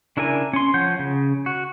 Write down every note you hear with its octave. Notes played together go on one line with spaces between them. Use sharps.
C#3 D4 E4 A#4 G#5
C#4 C6
F3 C#5 F#5 G6
C#3
F#4